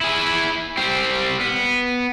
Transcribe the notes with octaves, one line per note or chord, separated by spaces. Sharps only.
E4 G#4
G3 C4
B3